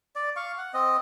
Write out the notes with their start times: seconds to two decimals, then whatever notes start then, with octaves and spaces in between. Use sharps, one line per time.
0.16 D5
0.36 F5 C#6
0.58 F#5
0.74 C4 D#5